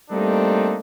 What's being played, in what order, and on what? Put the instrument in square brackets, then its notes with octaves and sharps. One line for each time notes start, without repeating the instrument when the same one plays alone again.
[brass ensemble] G3 A3 A#3 C4 D4 D#4